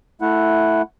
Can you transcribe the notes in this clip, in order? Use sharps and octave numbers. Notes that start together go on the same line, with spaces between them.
A3 E4 F#5